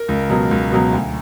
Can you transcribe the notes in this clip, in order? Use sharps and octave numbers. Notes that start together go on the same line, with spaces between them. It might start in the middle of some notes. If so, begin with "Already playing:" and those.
Already playing: A#4
C#2
B2 F#3
C#2
B2 F#3
D2